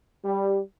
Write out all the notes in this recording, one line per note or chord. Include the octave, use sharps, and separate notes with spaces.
G3